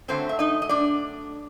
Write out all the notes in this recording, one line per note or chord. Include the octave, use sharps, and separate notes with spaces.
F#2 D3 F#3 A3 C4 C5
E5
D#4 D#5
D#5
D4 D5